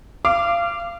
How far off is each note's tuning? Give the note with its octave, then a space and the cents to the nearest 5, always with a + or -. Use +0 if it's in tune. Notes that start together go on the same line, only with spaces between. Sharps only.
F5 -25 D6 +0